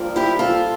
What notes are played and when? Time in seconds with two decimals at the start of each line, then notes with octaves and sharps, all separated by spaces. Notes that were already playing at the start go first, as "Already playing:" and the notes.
Already playing: G2 F3 A#3
0.16 E4 G4
0.39 F4 A4